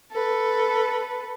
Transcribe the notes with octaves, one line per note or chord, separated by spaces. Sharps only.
A4 B4